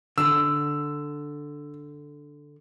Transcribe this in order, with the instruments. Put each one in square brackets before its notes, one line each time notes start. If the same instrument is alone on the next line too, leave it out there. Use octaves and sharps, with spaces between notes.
[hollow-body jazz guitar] D3 [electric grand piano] E6